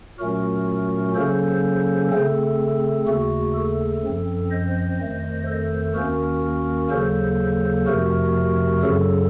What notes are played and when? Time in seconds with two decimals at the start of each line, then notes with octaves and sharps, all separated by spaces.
0.19 A#2 F#3 A3 C#4 F#4 A#4
1.15 C#3 F#3 A#3 C#4 A4 C5
2.11 C#3 A3 C4 A4
3.07 D#2 C#3 A3 F#4
3.55 A4
4.03 F#2 F3 C4
4.51 C5 D#5
4.99 F2 D#3 A3
5.47 A4 C5
5.95 D#2 D#3 A#3 C#4 F#4 A#4
6.91 D#2 C#3 F#3 A#3 A4 C5
7.87 F2 C3 F3 A3 F#4 A#4
8.83 F#2 C#3 F#3 A4